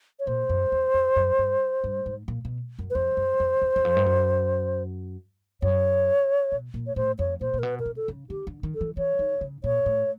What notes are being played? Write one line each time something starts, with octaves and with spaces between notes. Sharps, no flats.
C#5
A#2 C5
F#2
E2
F2
F#2
G2
G2
G#2
A#2
B2
F#2
B4
F2 C5
F#2
F2
E2
E2
F2
G2
F#2
F#2 C#5
B2
A#2
C#5
A2 C5
F2 C#5
A#2 C5
A#2
A#4
B2 B4
A#4
C3
A4
C#3
D3 G4
D3
D#3
A4
E3
E3 C#5
D#3
C#3
A#2 C#5
A2